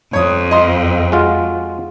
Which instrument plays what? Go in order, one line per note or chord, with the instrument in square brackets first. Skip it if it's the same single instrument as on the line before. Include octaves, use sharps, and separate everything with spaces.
[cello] F2 [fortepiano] C#5 D#6
[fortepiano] D#5 C6
[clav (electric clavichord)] G#3 F4 F#4